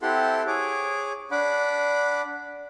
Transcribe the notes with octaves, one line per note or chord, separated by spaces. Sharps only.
C4 E4 G4 A4 F#5 C6
G#4 C#5 D6
D4 F#5 B5 D6